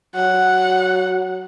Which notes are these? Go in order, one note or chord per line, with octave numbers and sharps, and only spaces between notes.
F#3 F#5